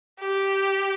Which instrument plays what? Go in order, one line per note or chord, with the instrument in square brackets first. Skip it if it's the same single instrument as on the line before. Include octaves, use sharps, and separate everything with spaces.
[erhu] G4